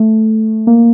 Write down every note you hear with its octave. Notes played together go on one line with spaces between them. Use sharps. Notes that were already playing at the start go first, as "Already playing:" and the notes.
Already playing: A3
A#3